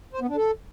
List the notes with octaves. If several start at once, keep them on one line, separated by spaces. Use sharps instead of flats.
C5
B3
D4
A4